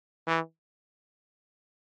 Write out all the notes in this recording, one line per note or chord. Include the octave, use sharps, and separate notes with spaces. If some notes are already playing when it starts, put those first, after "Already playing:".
E3